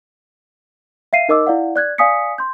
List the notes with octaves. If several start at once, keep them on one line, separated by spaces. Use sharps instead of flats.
E5 F5 C7 D#7
D#4 A#4 D#5 D6 E6
E4 D5 F5 F#5
D5 F#6 G#6
D5 F5 G#5 D#6 B6 C#7
C6 G6